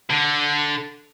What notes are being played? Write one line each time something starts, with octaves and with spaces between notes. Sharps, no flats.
D3